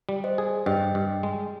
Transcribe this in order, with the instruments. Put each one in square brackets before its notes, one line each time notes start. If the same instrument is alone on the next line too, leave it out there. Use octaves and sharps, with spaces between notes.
[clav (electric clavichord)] G3
[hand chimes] C5 D#5
[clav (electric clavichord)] G#4
[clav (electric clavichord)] G2 [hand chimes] D#5 G5
[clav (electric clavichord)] G2
G#3